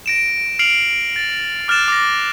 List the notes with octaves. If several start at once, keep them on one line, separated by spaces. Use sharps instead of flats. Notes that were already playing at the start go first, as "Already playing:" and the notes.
A#6 D7 E7
F6 C7 D7 F7 F#7
A6
D6 F6 F#6 A6 E7
D6 A#6